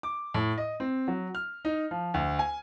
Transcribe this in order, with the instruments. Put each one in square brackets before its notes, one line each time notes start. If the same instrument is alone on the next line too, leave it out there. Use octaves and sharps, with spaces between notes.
[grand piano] D6
A2
D#5
C4
F#3
F6
D#4
F3
D2
G#5